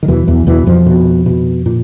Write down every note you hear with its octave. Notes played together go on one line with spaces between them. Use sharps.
D#3
E2 B2 E3
E2 E3
E2 B2 E3
F2 F3
B2
B2
A#2